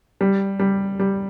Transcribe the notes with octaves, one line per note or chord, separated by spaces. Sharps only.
G3
G3
G3